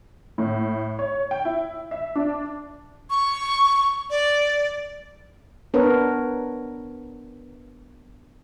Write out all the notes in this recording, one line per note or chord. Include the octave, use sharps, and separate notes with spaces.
A2
C#5
G5
E4
E5
D4
C#6
D5
B3 D4 A#4 B4 C#5